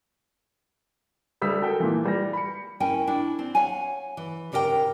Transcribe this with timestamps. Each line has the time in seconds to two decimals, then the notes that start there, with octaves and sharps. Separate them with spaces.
1.41 D2 G3 D#6 E6 B6
1.62 F#4 A4 A#4 G5
1.80 A#2 E3
2.05 G3 A#6
2.33 B5 C#7
2.80 C#4 E4 A#4 G5 G#5
3.07 D4 E4
3.39 C4
3.55 C#5 F5 F#5 G#5
4.17 E3
4.52 G#2 C#3 G4 A#4 C5 G5